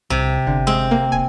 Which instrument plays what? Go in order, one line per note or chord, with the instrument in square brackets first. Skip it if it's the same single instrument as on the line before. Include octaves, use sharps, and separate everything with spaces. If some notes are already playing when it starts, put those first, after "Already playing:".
[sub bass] C2 [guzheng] C3
[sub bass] G1 [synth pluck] D3
[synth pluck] G#3 [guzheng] C4
[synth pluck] A#3
[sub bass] E1 [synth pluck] G#5